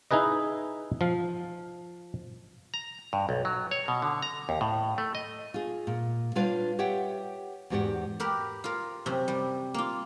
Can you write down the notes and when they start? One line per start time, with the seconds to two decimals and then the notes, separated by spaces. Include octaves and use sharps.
0.11 D#4 E4 G#4 B4 D#5
1.01 F3 F5
2.74 A#5
3.13 G2
3.29 B1
3.45 F#3
3.71 C#5
3.88 B2
4.02 D3
4.22 A#5
4.49 D#2
4.61 A2
4.98 A3
5.15 D#5
5.54 F4 G#4
5.87 A#2
6.35 G3 D4 F4 B4 C#5 F5
6.79 G4 C#5 E5 F#5 G5
7.70 E2 G#2 F#4 G4 D5 F#5
8.20 G4 A#4 B4
8.64 F4 A#4
9.06 F#2 C3
9.28 G3
9.74 A#3 F4